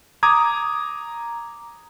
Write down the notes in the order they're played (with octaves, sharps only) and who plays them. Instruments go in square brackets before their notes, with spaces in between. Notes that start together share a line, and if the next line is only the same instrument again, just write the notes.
[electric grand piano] A#5 D6 D#6 G#6